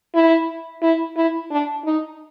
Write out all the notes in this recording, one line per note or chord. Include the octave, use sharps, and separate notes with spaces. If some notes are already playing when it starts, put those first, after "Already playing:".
E4
E4
E4
D4
D#4